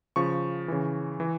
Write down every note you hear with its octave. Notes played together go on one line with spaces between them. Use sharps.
C#3 F3 C#6
C#3 E3
E3